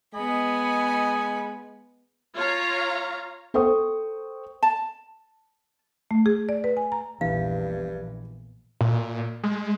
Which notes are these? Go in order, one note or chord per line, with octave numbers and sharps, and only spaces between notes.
G#3 B3 D#5 G#5 B5
F4 C#5 F5 A#5
A4 C5 G5 C#6 D#6
A5
A3
G#4
D5
B4
G#5
A#5
A#1 E2 G2 E3 F5
A#2
G#3
G#3